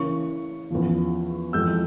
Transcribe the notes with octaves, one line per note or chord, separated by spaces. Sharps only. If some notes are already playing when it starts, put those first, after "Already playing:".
Already playing: C#3 E3 A#3 C#4 C#6
E2 C#3 F3
F2 E3 G#3 E6 G6